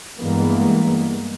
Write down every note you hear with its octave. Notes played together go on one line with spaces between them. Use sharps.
G2 E3 G#3 A#3 B3